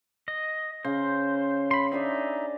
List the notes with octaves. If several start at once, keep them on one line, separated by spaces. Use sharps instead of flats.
D#5
C#3 C5
B5 C6
D4 D#4 G#4 D5 E5